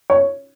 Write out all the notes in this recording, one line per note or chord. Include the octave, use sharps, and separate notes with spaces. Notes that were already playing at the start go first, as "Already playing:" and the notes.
C#5